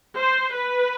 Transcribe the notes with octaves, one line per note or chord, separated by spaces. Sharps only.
C5
B4